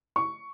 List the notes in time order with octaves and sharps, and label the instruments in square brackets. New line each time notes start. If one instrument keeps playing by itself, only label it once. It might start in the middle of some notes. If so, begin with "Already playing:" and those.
[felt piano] C#6